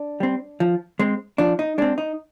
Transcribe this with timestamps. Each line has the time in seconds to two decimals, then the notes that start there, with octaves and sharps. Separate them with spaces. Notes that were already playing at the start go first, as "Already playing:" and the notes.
Already playing: D4
0.20 G3 C4
0.60 F3
0.99 G#3 C4
1.38 F3 D4
1.59 D#4
1.78 G#3 C4 D4
1.98 D#4